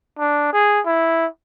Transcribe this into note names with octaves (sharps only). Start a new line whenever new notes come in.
D4
G#4
E4